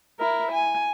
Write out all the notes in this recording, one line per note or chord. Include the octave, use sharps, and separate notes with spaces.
E4 A#4
G#5